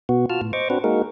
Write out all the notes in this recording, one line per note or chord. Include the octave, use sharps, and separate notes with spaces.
B2 B3 F#4
F4 F#4 A5 F6
A2
C5 D#5 C#6 D6
C4 D4 F#4 B4
G#3 A#3 D#4 F#4 G#4 A#4